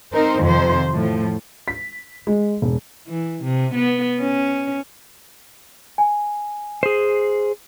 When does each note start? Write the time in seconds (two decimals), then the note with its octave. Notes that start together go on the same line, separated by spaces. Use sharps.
0.12 C4 D#4 A#4 C5
0.42 F2 C3 D#3 F3 C5
0.94 A2 F3
1.68 B6
2.27 G#3
2.62 E1
3.08 E3
3.43 C3
3.75 B3
4.20 C#4
5.98 G#5
6.83 G#4 C5